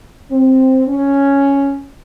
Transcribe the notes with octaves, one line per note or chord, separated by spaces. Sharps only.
C4
C#4